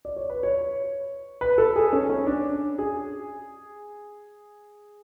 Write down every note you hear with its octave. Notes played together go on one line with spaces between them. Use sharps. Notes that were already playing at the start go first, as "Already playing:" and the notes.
D5
C#5
B4
C#5
B4
A4
G#4
C#4
C#4
D4
G#4